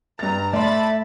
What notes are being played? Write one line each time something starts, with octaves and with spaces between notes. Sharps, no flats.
G2 A#5 A6
A3 D5 E5 A5 B5 C6 A6